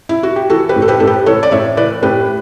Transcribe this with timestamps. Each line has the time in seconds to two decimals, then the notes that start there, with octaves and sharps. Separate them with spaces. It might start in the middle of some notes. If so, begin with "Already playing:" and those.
0.09 E4
0.23 F#4
0.36 G4
0.50 E3 F#4 A4
0.69 G4 B4
0.76 A2
0.82 A4
0.88 G4 B4
1.00 A2 A4
1.07 G4 B4
1.26 E3 A4 C#5
1.43 D5
1.52 A2 C#5 E5
1.77 E3 B4 D5
2.03 A2 G4 B4